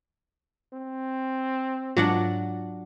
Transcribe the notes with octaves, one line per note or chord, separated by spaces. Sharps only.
C4
G#2 F#3 D4 F4 F#5